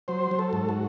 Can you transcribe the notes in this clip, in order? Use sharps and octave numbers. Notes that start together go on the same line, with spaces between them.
F#3 C5
F#3
A4
G#2
F#4